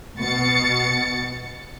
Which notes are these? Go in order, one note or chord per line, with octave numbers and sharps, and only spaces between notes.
B2 A6 C#7